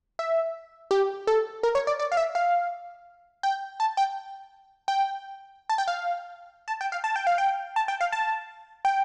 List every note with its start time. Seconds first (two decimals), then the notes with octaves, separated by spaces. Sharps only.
0.19 E5
0.91 G4
1.27 A4
1.63 A#4
1.75 C#5
1.87 D5
1.99 D5
2.12 F5
2.17 E5
2.35 F5
3.43 G5
3.80 A5
3.97 G5
4.88 G5
5.69 A5
5.78 G5
5.88 F5
6.68 A5
6.81 G5
6.92 F5
7.04 A5
7.16 G5
7.27 F5
7.38 G5
7.76 A5
7.88 G5
8.01 F5
8.12 A5
8.85 G5